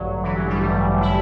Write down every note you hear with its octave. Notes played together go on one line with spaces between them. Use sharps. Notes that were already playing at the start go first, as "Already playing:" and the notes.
Already playing: A1 G2 D3 F#3
E3
F#3
G3
A1 G2 D3 A3
E4